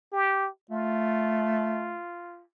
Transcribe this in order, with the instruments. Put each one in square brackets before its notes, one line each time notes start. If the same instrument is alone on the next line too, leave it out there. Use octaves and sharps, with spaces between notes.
[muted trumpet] G4
[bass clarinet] A3 [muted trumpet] F4